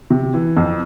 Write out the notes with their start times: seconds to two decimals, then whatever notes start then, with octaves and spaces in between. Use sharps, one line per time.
0.10 C3
0.34 E3
0.57 F2